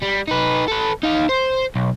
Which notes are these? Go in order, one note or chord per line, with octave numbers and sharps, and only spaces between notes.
G3
D#4 B4
A4 B4
D#4 F5
C5
B1